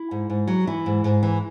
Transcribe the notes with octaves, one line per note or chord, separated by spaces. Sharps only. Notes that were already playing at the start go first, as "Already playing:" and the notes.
Already playing: E4
G#2
G#2
F#3
E3 E4
G#2
G#2
E3